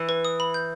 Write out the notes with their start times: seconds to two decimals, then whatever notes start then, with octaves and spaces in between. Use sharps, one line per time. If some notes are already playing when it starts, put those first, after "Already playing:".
Already playing: E3
0.09 B4
0.25 D#6
0.40 B5
0.54 G6